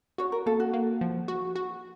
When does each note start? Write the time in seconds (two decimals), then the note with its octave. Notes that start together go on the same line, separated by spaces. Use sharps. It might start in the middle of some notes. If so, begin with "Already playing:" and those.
0.18 F#4 C#5
0.32 A#4
0.46 A#3 A4
0.60 F#4
0.73 A#3
1.01 F3
1.28 F#4
1.56 F#4